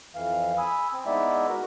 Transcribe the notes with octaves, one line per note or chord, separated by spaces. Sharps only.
F2 E3 F5
G#5 B5 D#6 E6
C4
G#3 B3 D#4 E4 D5 E5
F#4 A#4